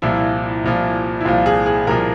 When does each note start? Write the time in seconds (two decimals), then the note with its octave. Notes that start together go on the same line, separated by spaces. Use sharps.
0.02 C2 A#2 F3 E4
0.64 C2 A#2 F3
1.21 E4
1.25 C2 A#2 F3 F4
1.46 G#4
1.66 G#4
1.87 C2 A#2 F3 A#4